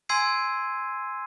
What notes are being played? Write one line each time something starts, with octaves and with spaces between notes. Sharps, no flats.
G#5 C6 E6 G#6 C7 D#7